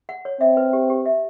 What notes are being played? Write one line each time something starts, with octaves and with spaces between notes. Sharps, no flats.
F#5
C#5
C4 E5
B4
G4
G4
E5